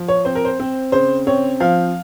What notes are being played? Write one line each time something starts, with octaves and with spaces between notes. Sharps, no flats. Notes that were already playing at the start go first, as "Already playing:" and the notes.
Already playing: F3
C#5
C4 C5
A#4
C5
C4
C#3 C5
C4 C#5
F3 F5